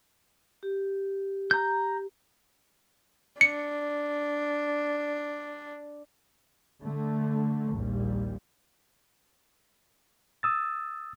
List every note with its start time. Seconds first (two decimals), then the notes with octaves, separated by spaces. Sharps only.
0.63 G4
1.51 A#5 G6
3.41 D4 C#7
6.82 D3 A3
7.73 A#1 D#2 A#2 G3
10.43 D#6 E6 A6